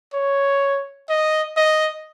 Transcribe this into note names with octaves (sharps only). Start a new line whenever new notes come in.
C#5
D#5
D#5